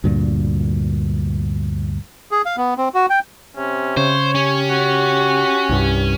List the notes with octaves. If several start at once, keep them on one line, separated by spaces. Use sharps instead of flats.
D2 G2 A#2
G#4
F5
B3
C4
F#4
G5
C3 C#4
C#3 C5 C#5
C#4 G4
F#4
C2 G2